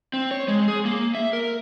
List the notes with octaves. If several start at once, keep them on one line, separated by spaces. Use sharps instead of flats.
C4
C#5
G#3
G#4
A#3
E5
A#4